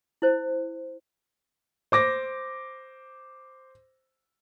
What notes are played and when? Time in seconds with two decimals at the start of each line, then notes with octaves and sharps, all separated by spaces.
0.22 E4 C5
1.92 C5 D6 A#6